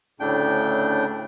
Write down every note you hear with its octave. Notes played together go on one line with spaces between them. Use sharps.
D2 A2 C#3 A3 D4 G5